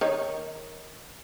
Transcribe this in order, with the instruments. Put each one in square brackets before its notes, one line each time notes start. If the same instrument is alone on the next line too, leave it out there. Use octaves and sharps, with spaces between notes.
[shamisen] D#3 D#4 C#5